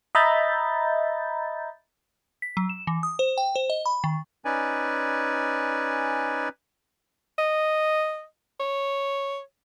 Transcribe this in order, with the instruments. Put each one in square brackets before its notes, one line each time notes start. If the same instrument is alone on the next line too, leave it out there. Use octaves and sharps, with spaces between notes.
[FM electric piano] D#5 E5 A#5 B5 G6 A6
[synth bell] B6
F#3
E7
E3
D#6
C5
G5
C5
D#5
B5
D#3
[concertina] C#4 D#4 B4 D5 G#5
[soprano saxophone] D#5
C#5